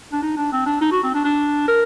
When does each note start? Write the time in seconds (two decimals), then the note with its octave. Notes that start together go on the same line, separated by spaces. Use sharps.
0.13 D4
0.23 D#4
0.37 D4
0.52 C4
0.66 D4
0.81 D#4
0.92 F#4
1.03 C4
1.14 D4
1.25 D4
1.68 A#4